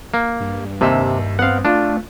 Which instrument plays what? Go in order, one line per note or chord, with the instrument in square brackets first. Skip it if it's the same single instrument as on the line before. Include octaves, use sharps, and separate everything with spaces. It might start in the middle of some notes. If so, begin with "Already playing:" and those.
[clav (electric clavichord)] A#3
[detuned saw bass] G2
[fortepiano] D#2 E5 C6 [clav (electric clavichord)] C3
[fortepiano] B3 C4 [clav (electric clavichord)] F5 F#5
[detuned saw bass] A3 [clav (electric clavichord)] D4 [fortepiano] F4